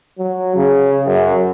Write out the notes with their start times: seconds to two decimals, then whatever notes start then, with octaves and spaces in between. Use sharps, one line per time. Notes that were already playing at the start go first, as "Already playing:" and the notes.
0.19 F#3
0.56 C#3
1.07 F#2